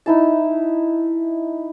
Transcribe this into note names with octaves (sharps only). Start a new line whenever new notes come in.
D#4 E4 A5